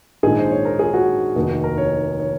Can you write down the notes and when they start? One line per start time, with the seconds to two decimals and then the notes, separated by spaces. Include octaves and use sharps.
0.23 A#1 G#2 D#3 G#4
0.38 C5
0.51 C#5
0.65 A#4
0.79 G#4
0.94 F#4
1.35 F1 D#2 D#3
1.64 A#4
1.78 C#5
2.20 C#5